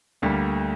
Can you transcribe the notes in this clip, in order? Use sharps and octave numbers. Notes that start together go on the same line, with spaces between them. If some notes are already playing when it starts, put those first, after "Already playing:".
D2 D3 G3 A#3